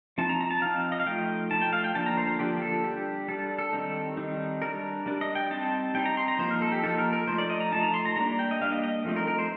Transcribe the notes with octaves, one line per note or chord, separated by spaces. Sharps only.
F3 C4 D#4 A5
A#5
A#5
A5
F3 C4 D#4 F5
D#5
F5
F3 A3 D#4 G5
F3 A3 D#4 A5
G5
F5
G5
D3 F3 A#3 D4 A5
A#5
C5
D3 F3 A#3 D4 G4
A4
G3 D4 G4
G3 D4 A4
A4
D#3 G3 C4 D#4
D#3 G3 C4 D#4
G3 D4 A#4
G3 D4
D#5
G5
G3 C4 D#4 A5
G3 C4 D#4 G5
A#5
C6
A#5
F3 A#3 D#4 C5
A#4
A4
G4
F3 A#3 D#4 A4
A#4
A#4
F3 A3 D#4 C5
D5
D#5
A#5
F3 A3 D#4 A5
A#5
C6
A#5
G3 A#3 D4 A#5
G5
D#5
G3 A#3 D4 F5
D#5
D#5
F3 A3 C4 D#4
A#4
A#4
C5